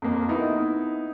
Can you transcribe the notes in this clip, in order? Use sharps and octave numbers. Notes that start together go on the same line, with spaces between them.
F2 A#3
B3 D#4 E4